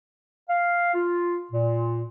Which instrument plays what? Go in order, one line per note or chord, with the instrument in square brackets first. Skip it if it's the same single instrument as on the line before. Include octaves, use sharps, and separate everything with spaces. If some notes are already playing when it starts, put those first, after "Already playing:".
[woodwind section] F5
F4
A#2